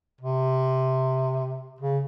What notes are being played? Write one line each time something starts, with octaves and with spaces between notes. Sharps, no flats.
C3
C#3